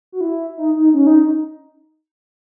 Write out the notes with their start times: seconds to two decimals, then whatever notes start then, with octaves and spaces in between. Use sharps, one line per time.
0.12 F#4
0.21 E4
0.57 D#4
0.76 D#4
0.94 C#4
1.07 D#4